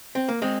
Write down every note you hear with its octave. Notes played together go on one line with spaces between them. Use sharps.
C4
A#3
G#3 C4